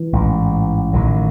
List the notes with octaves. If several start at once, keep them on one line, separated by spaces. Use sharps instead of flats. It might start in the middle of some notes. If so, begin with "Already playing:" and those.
Already playing: E3
A1 G#2
A1 A2 D#3 F#3